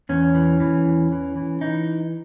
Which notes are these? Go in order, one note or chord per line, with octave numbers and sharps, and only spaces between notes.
E2 C#4
E3
E3
E2
E3
E3
E3 D#4